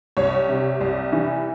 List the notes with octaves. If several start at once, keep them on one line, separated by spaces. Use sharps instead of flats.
C2 C#5
C3
C2
E3